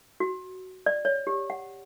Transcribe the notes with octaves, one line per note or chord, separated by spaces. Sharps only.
F#4
D5
C#5
G4
F#5